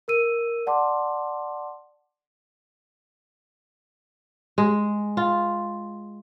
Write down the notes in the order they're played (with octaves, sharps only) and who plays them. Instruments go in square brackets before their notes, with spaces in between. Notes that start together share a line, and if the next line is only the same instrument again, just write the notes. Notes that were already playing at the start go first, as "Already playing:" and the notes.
[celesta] A#4 E6 D#7
D5 F#5 A5 C6 D6
[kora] G#3
F4